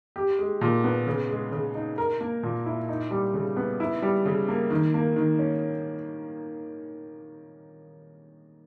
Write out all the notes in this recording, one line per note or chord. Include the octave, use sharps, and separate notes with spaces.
G4
G#3
A#2
B3
C#3
G#3
C#3
D#4
A#4
A#3
A#2
E4
D#4
G3
C#3
B3
E4
G3
C#3
A#3
D#3
A#3
D#3
C#4